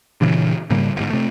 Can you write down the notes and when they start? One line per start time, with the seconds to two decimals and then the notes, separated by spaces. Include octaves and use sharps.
0.21 G2 A#2 C#3 E3
0.70 G#2 C#3 G3 A#3
0.96 G1 G#2
1.10 C3 A3